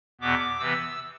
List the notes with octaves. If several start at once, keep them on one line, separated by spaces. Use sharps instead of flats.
E2 B2 B3 D6
C3 E3 B3 E6